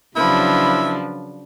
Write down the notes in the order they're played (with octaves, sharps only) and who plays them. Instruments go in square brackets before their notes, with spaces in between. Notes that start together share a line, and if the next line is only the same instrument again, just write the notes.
[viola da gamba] C#3 F#3 D4 [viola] F3 B4 [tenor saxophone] E4